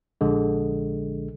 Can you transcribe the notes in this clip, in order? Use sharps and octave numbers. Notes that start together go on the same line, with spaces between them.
A#1 D3 G#3